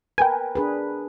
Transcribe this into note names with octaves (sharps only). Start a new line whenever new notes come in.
A#4 B4 G5 G#5
D4 G#4 B4